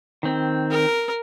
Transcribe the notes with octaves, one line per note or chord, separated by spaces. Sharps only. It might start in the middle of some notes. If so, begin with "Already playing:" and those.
D#3 C4
A#4